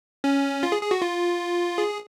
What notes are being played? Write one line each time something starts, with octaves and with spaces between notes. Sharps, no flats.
C#4
F4
G#4
G#4
F#4
F4
G#4